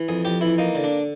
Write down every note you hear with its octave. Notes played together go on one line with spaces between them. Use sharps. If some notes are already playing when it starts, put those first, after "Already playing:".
Already playing: E3
F2 G#4
F2 G4
E3 E4
A#3 D#4
D3
D4